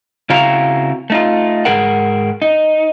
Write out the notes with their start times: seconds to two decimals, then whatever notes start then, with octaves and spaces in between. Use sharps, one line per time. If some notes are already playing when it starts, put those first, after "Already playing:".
0.30 C#3 C4 E4 F#4 F5 A#5
1.10 A3 D#4 F4
1.65 G#2 G#4 A#4 F#5
2.42 D#4